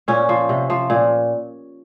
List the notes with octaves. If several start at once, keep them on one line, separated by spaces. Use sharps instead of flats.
A#2 C#4
F3
C3
F3
A#2